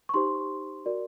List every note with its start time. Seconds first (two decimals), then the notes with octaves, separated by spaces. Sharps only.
0.09 C#6
0.14 D#4 G4 C5 C6
0.86 F#4 A#4 D5